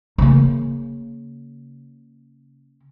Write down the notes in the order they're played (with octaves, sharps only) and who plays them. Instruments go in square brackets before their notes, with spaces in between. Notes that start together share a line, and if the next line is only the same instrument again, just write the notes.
[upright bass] C#3 A#3